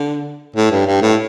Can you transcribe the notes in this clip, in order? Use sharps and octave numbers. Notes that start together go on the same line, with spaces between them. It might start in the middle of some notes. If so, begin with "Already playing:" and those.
Already playing: D3
A2
G2
G2
A2